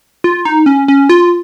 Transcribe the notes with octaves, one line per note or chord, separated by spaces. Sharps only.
F4
D#4
C#4
C#4
F4